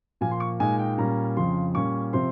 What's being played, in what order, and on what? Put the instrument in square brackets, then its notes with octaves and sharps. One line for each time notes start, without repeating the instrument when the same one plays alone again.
[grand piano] A#2 F3 A#3 G#5
C6
C#6
A#2 G#3 D#4 G#5
G5
A#2 G3 C#4 A#5
F2 C#3 F3 C6
A#2 G3 C#4 C#6
C3 F3 C4 C6